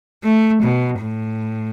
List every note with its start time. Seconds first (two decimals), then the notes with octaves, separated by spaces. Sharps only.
0.24 A3
0.62 B2
1.01 A2